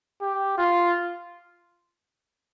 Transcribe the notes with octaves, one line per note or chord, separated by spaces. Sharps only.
G4
F4